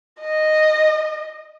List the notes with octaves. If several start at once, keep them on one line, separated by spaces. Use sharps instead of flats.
D#5